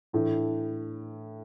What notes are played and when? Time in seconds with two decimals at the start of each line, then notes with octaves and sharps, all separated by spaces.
0.13 A2 E3 A3 D4